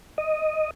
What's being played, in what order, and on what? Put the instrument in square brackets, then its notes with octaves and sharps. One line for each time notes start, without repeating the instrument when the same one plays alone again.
[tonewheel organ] D#5